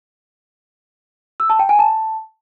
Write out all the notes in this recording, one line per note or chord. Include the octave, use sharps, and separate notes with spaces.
E6
A5
G5
G#5
A5